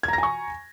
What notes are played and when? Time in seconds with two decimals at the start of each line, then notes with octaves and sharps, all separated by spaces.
0.03 G#6
0.08 A#5
0.13 A#6
0.18 G#5
0.23 C#6